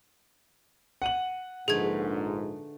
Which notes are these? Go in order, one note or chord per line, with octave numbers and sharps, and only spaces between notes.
F#5 D#7 F#7
A#1 G#2 D3 A3 G#4 B4 G#6